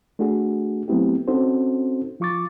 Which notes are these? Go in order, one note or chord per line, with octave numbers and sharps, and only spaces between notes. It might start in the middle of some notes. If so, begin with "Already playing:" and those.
A3 D4 F#4 G#4
F#3 A3 B3 C4 E4 G4
C4 C#4 D#4 F#4 A4 C5
F3 F4 C#6 D6 A6